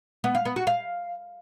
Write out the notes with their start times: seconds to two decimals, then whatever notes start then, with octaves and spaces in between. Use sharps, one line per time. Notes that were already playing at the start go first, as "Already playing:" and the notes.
0.24 B3
0.35 F5
0.45 B3
0.56 F#4
0.67 F5